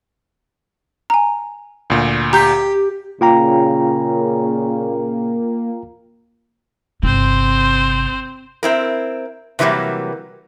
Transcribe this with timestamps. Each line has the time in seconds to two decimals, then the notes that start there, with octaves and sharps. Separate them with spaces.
1.10 G#5 A#5
1.90 D2 A#2
2.33 G4 A#5 G6
3.21 A#2 C#3 A#3 F4 G5 A#5
7.03 G1 C3 C4 C5
8.63 C4 E4 A#4
9.59 C3 E3 F#3 G3 A#3